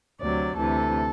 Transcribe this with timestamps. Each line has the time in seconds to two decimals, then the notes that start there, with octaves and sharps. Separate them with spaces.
0.19 D2 C3 F#3 D5
0.55 D2 C3 E3 A4